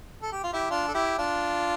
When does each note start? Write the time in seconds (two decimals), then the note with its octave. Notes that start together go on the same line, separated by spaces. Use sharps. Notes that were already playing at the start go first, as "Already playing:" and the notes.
0.22 A4
0.32 G4
0.43 F4
0.53 E4 G4
0.70 D4 F4
0.88 A4
0.94 E4 G4
1.18 D4 F4